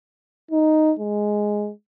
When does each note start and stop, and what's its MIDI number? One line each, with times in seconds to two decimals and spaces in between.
0.51 0.93 63
0.99 1.71 56